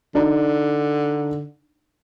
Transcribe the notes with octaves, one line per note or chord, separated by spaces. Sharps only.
D3 D4 D#4